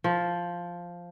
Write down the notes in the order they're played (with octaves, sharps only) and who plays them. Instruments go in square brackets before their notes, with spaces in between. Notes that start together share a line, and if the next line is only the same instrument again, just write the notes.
[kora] F3